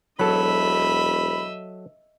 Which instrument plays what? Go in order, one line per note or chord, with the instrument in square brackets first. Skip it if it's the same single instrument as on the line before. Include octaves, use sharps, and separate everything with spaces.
[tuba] E1 [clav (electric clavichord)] F#3 A4 [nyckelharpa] D#5 E5 [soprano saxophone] B5